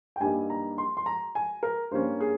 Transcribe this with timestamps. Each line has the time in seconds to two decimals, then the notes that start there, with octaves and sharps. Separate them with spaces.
0.16 G5
0.20 G2 G3 A#3 D#4 G#5
0.50 A#5
0.78 C6
0.97 C6
1.06 A#5
1.35 G#5
1.63 A#4
1.91 G2 G3 A#3 C#4 C5
2.21 G#4